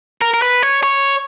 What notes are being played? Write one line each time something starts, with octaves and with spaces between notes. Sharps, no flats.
A#4
A#4
B4
C#5
C#5